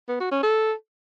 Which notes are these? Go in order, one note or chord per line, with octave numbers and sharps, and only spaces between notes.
B3
F#4
C#4
A4